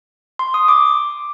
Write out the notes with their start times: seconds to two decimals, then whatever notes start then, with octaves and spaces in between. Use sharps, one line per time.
0.39 C6
0.54 D#6
0.68 D6